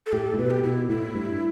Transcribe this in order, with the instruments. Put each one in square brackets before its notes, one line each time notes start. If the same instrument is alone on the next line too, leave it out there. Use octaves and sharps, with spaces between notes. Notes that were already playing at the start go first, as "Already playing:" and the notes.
[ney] A4
[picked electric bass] A2 [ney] G4
[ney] A4
[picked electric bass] A2
[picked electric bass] B2 [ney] B4
[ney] G4
[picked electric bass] B2 [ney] E4
[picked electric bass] A2 [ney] E4
[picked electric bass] G2